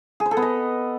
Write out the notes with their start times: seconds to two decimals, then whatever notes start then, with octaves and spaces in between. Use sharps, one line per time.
0.20 G#4
0.26 C5
0.31 A4
0.37 B3
0.42 D#5